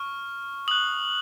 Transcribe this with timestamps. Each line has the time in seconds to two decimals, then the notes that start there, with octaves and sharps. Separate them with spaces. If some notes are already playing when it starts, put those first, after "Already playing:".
Already playing: C#6 F6
0.68 D#6 F#6 F#7